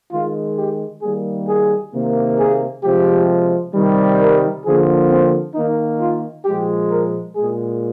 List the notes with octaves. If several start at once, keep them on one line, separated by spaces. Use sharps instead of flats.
D#3 G#3 F4
G4
D#3 G3 A#3 G#4
G#4
C3 D#3 A#3
G#4
C3 F3 G#3 G4
C3 D#3 G3
A#4
D3 F3 A#3 G#4
C4
D#3 A#3 D#4
F4
A#2 F3 G#3 G4
A#4
A#2 G#3 G#4